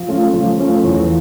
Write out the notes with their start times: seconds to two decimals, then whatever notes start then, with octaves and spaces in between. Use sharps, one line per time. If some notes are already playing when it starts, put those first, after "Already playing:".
Already playing: F3
0.08 A3 C#4 F4
0.33 F3
0.59 A3 C#4 F4
0.83 E2